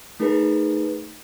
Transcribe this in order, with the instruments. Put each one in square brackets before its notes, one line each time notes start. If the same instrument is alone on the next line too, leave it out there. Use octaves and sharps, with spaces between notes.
[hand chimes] A3 D#4 G#4 A#4 B4